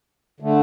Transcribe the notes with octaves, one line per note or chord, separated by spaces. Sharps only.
D3 A3